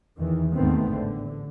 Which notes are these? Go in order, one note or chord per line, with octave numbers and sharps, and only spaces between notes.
E2 D#3 E3
D#2 G#2 D#3 A3 B3 C4
A1 D3